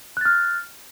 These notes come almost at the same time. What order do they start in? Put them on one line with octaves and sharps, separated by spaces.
F#6 A6 F6